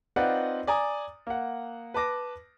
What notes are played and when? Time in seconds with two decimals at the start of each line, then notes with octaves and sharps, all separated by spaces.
0.16 C4 D#4 F4 B4 D5 F#5
0.67 D5 G#5 A#5 D#6
1.27 A#3 F#5
1.94 B4 A5 D6 A#6